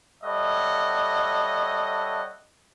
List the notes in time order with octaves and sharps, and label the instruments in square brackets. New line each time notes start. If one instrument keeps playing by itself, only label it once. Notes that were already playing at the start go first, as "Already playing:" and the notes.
[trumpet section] G3 A4 C#5 D#5 E5 F#5